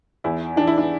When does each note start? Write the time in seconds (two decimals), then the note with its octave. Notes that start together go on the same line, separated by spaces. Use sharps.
0.24 E2 E4
0.56 E3 D4
0.67 E4
0.77 D4